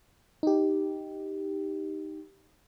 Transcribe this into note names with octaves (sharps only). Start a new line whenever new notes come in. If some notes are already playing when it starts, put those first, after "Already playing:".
D#4 G4